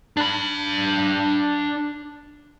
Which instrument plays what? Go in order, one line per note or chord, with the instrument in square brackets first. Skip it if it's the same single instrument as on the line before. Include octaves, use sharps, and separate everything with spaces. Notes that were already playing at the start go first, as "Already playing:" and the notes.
[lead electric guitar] D4 B5